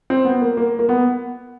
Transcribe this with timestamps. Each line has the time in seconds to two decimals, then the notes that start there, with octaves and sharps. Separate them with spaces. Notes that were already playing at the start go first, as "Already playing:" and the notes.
0.10 C4
0.25 B3
0.42 A#3
0.57 A#3
0.79 A#3
0.89 B3